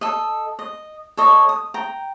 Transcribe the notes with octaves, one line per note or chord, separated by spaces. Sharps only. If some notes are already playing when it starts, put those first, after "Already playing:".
A4 D#5
D#5
A4 C#5 D#5
D#6
G5 A#5